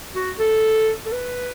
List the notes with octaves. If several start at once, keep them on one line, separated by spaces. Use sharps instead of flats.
F#4
A4
A4
B4